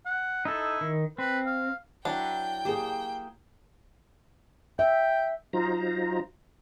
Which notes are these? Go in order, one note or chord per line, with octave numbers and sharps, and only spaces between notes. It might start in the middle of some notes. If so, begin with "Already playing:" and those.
F#5
D#4 E4 A4
D#3
C4 B4
F5
F#3 D4 E4 B4 G5
A#3 G4 G#4 C5
E5 G5
F#3 D#4 F4 C5 A#5